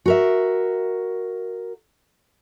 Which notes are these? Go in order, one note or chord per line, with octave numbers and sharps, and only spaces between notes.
F#4 A#4 E5